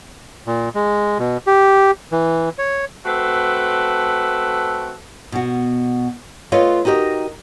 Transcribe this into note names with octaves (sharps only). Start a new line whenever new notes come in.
A#2
G#3
B2
G4
E3
C#5
A3 C4 F#4 A4 B4
B2 F#4
A3 F4 B4 C#5 D#5 F5
D#4 F#4 G4 A#4 D#5